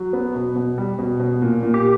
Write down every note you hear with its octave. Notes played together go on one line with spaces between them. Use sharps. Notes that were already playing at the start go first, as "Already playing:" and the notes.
Already playing: F#3
B3
B2
B2
G3
B2
B2
A#2
A#2
G4